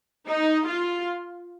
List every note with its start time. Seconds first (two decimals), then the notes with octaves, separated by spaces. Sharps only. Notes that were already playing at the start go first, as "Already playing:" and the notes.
0.28 D#4
0.68 F4